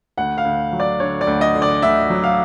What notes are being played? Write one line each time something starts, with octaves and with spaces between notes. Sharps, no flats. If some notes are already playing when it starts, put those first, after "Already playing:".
D2 F#5
F5
D2
F#3
D5
D3 C#5
D5
D2
D#5
D3
D5
D2 E5
F#3
F5